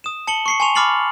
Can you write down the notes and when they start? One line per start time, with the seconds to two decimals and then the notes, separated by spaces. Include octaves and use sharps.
0.04 D#6 E7
0.27 A5 C#7 F#7 G7
0.46 C#6 C7 C#7
0.60 G#5 A5 C6 C#6 F7
0.75 B5 D6 F6 A6 C7 F#7